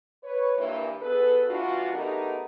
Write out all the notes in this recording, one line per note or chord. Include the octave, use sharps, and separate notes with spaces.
B4 C#5
G2 A#2 E3
B3 G#4 A4 B4
E3 G3 D4 F4 F#4
A3 B3 D#4 G4 G#4 A#4